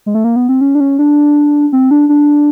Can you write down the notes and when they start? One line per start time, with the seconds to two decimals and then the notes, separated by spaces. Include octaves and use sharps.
0.06 G#3
0.15 A3
0.24 A#3
0.36 B3
0.49 C4
0.61 C#4
0.75 D4
0.80 C#4
0.99 D4
1.73 C4
1.91 D4
2.09 D4